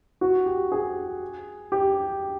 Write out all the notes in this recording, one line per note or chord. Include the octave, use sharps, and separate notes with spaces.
F#4
G4
G#4
G4